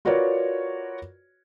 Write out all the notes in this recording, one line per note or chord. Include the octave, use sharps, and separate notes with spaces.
F4 F#4 A#4 B4 C#5 D5